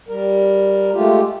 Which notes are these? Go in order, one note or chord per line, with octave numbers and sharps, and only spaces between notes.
G3 A#4
G#3 A3 F4 G4